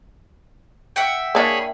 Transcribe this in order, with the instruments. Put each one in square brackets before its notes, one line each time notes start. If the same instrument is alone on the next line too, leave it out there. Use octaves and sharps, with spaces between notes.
[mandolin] E5 F#5 G5
[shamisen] A#3 D4 E4 [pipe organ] G#4 C#5 B5